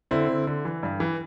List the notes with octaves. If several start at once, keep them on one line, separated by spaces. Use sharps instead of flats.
D3 C4 E4
D3
D3
E3
G2
E3